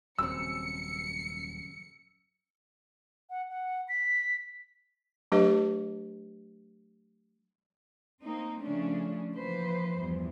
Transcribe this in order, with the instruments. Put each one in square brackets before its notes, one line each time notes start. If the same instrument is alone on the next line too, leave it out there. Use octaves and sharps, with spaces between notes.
[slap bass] D#1 [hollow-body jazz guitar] F#2 C#3 C4 [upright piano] E6 [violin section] C#7
[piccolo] F#5
F#5
B6
[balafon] F#3 A3 D4 G4 B4 D#5
[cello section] A#3 C4 D#4
C#3 F3 A3 C#4 D4
E3 F3 A#3 B4 C5
E2 G2 E3 F3